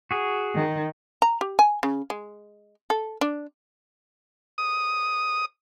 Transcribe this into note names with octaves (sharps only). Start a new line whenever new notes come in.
F#4 G#4
D#3
A#5
G4
G#5
C#3
G#3
A4
D4
D#6